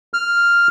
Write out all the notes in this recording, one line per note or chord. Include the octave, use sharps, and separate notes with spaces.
F6